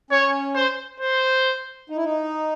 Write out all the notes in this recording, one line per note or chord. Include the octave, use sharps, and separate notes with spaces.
C#4 C#5
C5
C5
D#4
E4
D#4